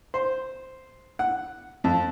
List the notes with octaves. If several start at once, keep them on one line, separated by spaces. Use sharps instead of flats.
C5
F#5
F2